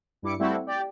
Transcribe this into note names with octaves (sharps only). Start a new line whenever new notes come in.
G2 E4 D6 C#7
G3 A3 C4 E4 F#4 A4
G4 D5 G5